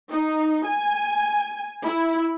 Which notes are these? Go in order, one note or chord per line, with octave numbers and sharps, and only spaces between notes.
D#4
G#5
E4